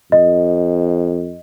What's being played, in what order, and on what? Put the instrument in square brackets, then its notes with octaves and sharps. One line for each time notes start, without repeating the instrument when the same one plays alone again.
[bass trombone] F2 [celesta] D#5